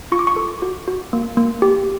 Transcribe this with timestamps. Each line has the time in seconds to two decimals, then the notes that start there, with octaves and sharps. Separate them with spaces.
0.12 F4 C#6
0.19 D6
0.27 C#6
0.36 A4
0.62 F#4
0.88 F#4
1.13 A#3
1.37 A#3
1.62 G4